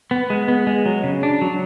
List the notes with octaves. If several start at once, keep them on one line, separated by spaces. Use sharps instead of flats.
B3
G#3
B3
G#3
F#3
C#3
D4
F#3